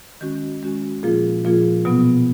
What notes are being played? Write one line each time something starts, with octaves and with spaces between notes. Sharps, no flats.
D#3 G#3 C#4 F#4
D#3 G#3 C#4 F#4
A#2 F3 A#3 F4 G#4
A#2 F3 A#3 F4 G#4
B2 F#3 B3